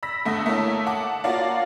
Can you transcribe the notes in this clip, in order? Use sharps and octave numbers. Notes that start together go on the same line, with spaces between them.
B5 E6 A#6 B6
G1 A3 F#5 A5 D#6 A#6
A3 A#3 E4 C#5 A5
F#5 A5 D6
A#3 F4 F#4 C#5 D5 F5